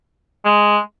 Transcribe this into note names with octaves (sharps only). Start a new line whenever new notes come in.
G#3